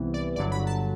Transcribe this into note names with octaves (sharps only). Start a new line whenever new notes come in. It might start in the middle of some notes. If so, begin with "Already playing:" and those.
Already playing: C2 C3 E3 B3
D5
G1 G2 D3 F#3 D5
B5
A5